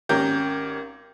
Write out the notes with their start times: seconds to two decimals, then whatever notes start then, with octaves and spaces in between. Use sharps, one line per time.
0.09 G#1 C#4 G4 A#4 G6